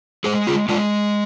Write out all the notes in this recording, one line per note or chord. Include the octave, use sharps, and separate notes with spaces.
G#3 G#4 C5
F4 G#4
G#3 D4 F4